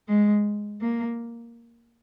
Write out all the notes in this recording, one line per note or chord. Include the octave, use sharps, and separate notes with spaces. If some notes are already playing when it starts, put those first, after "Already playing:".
G#3
A#3